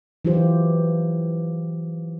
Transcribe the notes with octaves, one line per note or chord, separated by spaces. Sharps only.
E3 F#3 F4 G4 C5